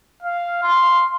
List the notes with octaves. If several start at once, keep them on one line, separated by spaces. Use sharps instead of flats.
F5
C6